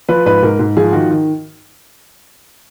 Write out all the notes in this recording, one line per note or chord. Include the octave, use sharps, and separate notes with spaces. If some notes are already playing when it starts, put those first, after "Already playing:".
F3 B4
G#2 B4
G#2 A#4
G#2
F3 G#4
D#3 F#4
D#3